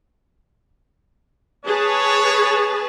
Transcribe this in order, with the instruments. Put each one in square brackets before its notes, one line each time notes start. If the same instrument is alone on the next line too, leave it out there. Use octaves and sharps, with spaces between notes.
[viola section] G#4 B4 A5 [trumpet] C#5